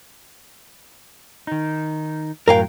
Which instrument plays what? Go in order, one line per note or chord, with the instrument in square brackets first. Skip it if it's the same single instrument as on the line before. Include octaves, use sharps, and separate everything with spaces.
[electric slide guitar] D#3 D#4
[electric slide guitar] F#2 A2 F#3 [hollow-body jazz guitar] A#4 F5 G5